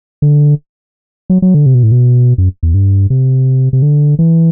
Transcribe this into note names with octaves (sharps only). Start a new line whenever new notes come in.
D3
F#3
F#3
D3
C3
B2
A2
B2
F#2
E2
G2
C3
C3
D3
E3